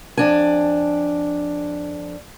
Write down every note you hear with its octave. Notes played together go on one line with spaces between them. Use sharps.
F2 D4 G#5